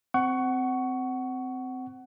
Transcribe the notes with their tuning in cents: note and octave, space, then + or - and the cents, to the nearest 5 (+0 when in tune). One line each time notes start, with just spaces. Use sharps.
C4 -15 F#5 +20 C#6 +5